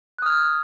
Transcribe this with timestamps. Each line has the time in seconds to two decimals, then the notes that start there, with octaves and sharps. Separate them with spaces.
0.18 F#6
0.22 D#6
0.26 F6
0.30 G#6